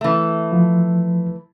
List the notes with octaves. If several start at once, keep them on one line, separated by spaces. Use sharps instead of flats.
E3 A3
F3